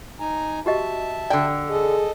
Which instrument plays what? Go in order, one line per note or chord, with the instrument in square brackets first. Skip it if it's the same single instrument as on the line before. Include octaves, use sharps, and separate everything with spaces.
[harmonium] D#4 G#5 A#5
[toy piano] F#4 G4 D#5 [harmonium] E5 A5
[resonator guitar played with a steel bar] D3 G5 [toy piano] D5
[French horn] G#4 [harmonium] A4 D#5